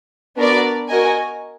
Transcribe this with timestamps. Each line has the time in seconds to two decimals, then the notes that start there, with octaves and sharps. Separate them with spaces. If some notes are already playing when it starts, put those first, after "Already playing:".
0.36 B3 D4 F#4 A#4 D5
0.88 F#4 A#4 D#5 G#5